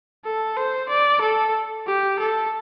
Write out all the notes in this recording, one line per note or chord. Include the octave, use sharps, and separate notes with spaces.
A4
C5
D5
A4
G4
A4